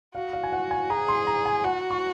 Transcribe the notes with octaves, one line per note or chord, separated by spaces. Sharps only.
F#4 F5
F5
G#5
F#5
G#5
G#4 A#5
C6
A#5
G#5
F#4 F#5
C#6